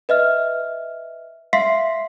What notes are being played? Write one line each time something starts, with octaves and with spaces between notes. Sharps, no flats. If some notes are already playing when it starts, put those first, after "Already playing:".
B4 D#5 E5 F6
E5 F5 C6 B6 C7